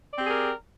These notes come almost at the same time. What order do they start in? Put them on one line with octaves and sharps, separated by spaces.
D5 C4 G4 G#4 A#4